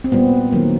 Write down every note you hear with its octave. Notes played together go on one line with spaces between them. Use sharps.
C4
A#2 G3 A#3 B3
D#3 F#3 A#3